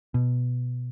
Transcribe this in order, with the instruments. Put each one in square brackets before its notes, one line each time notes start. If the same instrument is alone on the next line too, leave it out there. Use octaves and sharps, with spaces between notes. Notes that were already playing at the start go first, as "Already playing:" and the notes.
[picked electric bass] B2